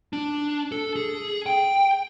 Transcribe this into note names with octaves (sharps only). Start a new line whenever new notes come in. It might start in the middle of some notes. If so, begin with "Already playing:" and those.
D4
A4
G#4
G5